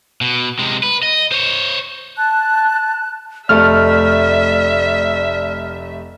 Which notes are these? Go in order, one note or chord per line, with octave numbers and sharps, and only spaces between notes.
B2
C3 G#3
B4
D#5
C5 C#5
A5 F#6
F1 A3 A4 D5 E5 F6